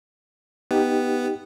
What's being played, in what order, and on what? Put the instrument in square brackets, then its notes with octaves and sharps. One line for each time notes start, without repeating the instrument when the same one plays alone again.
[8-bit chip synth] B3 [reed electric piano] D#4 G4